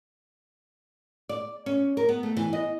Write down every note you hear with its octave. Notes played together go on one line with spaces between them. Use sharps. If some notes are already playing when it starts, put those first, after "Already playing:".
D5
C#4
A#4
B3
A3
E3
D#5